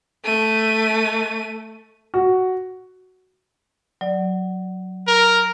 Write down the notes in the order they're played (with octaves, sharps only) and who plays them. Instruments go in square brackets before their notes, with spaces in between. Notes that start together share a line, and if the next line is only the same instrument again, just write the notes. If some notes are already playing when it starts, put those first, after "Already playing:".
[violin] A3 D#7
[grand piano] F#4
[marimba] F#3 D5
[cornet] A#4